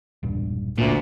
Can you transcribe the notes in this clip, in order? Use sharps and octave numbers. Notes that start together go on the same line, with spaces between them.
E1 A#1 G2
G#1 D2 A#2